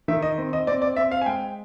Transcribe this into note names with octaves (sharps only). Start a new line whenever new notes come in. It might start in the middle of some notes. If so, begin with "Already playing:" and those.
D#3 E5
D#5
C4
D#5
C4 D5
D5
C4 E5
F5
G#5
G#3 G5